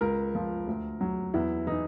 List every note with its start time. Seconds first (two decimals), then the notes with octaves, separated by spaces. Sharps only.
0.01 C#2 A#4
0.35 F3
0.67 D2
1.01 F#3
1.34 E2 E4
1.67 E3 D#4